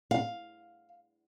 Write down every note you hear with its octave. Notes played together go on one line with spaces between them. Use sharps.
F5